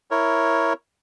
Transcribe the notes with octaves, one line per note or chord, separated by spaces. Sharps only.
E4 A#4 C#5